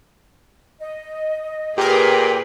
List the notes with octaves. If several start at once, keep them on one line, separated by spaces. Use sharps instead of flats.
D#5
A#2 G4 G#4 A#4 B4 G5